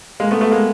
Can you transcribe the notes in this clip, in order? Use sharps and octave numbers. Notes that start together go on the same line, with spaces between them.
G#3 A#3
A3 B3
A3 B3
G#3 A#3